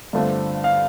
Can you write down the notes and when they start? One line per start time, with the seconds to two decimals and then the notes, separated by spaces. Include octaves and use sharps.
0.13 G2 D3 A3 C4 F4
0.64 F5